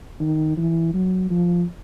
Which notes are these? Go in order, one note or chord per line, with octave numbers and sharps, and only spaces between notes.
D#3
E3
F#3
F3